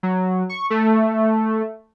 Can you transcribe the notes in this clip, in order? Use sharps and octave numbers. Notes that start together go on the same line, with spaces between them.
F#3
C#6
A3